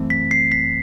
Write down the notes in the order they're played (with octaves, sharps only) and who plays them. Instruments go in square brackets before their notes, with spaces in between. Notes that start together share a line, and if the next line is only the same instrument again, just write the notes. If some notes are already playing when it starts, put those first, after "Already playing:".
Already playing: [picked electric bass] F#2 E3 A3 C4
[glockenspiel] B6
C7
B6